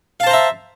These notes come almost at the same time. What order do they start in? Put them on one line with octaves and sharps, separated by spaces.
F5 A5 C5 A#5 E5